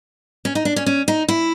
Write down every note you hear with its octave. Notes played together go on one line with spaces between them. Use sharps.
C#4
D#4
D4
C#4
C#4
D#4
E4